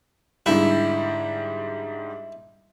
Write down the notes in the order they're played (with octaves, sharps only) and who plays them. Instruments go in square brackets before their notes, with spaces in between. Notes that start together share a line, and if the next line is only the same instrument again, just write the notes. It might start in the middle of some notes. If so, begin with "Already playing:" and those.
[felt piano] G#2 D3 G3 [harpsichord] E4